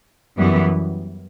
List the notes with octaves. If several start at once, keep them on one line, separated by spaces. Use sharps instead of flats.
F#2 E3 G3 B3